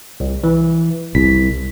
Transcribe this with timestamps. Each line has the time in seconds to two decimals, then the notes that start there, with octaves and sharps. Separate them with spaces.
0.20 C2
0.44 E3
1.15 C2 B6